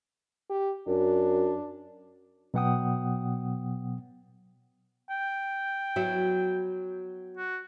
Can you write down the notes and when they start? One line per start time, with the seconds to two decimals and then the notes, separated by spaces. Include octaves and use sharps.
0.50 G4
0.87 F#2 D4
2.54 B2 F#3 B3 F#5 G5 D#6
5.10 G5
5.96 F#3 B3 E4
7.37 F#4